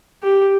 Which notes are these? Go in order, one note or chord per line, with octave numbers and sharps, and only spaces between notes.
G4